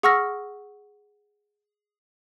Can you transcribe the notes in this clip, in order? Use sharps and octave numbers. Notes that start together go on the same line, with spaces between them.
G#4 F#5 C#6 E6 F6 A#6